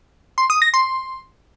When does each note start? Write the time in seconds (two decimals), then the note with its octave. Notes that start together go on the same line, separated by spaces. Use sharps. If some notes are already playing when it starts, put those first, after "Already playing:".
0.38 C6
0.50 D#6
0.62 A#6
0.74 C6